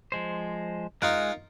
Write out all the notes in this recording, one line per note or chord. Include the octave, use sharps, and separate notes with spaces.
F3 G#3 C5
G#3 D#4 F4 A#4 F#6